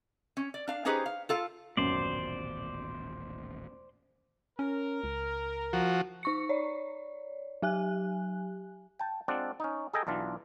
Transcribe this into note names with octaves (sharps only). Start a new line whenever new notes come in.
C#4
D5
D4 F5
C#4 D#4 G4 G#4 B4 C5
F5
F4 A4 F5
D#1 A1 F#2 B2 C5 D5
C#4 A#4
C#2
F3 F#4
D#4 C#6 C#7
C#5 D5
F#3 G4 G#5 F#6
G5 A5
G#3 C4 D4 F4 D5 F#5
C#4 D#4
G#4 A4 D#5 G5 G#5 A#5
B1 E3 D4 F4